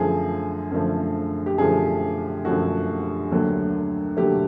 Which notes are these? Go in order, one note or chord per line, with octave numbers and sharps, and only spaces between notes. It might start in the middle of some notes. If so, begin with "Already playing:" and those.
Already playing: F#2 D3 F3 A3 G#4
F#2 D3 F3 A3
G4
F#2 D3 F3 A3 G#4
F#2 D3 F3 A3 F#4
D#2 D3 F#3 A3
D#2 D3 F#3 A3 G4